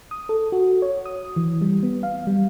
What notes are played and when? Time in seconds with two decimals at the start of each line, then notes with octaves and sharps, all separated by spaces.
0.11 D#6
0.29 A4
0.52 F#4
0.82 C#5
1.06 D#6
1.36 E3
1.61 G3
1.83 B3
2.03 F5
2.27 G3